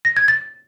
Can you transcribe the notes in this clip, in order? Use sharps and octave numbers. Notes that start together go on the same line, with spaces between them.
A#6
G#6
A6